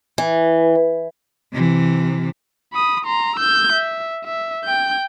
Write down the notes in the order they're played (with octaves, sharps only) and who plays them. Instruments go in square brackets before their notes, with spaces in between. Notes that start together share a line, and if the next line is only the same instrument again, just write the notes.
[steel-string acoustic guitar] E3
[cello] C3 E3
[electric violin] B5 D#6
A#5 C6
E6 G6
E5
E5
G5 G6